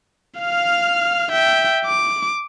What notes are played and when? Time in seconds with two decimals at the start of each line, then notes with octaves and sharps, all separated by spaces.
0.40 F5 F6
1.32 E5 G5
1.86 D6